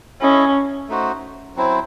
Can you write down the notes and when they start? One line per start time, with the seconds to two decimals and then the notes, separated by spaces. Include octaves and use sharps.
0.21 C#4 E4 A4 D#5
0.88 A3 D#4 F#4 C5
1.56 F#3 C4 E4 C5